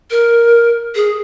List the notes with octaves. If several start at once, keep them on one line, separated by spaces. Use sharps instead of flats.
A#4
G#4